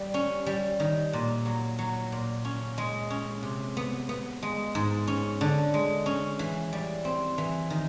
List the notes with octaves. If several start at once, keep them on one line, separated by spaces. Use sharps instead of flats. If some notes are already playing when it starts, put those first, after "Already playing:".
Already playing: G3
C#4
G3
D#3
A#2
F#3
F#3
A#2
C#4
G#3
C#4
C3
B3
B3
G#3
G#2
C#4
D3
G#3
C#4
E3
G3
C4
E3
D#3